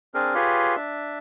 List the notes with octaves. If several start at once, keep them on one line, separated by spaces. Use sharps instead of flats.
C4 D4 G#4 A#4
F4 G4 G#4 B4 C#5 C6
D4 E5